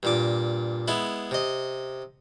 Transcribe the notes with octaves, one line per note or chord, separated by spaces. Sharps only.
G2 A#2 D6
G#3 B3 E4
C3 D#5